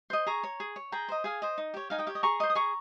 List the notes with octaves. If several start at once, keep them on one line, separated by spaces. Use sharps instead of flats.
C5 D#5
G#4 A#5 C#6
C#5
G#4
C#5
G#4 G5 A#5
C5 D#5
G#4 F5 G#5
C5 D#5
D#4
G4 C#5
D#4 F5 G#5
D#5 G5
G4 C#5 F5
D#5
G#4 A#5 C#6
C5 D#5
D#6
G#4 A#5 C#6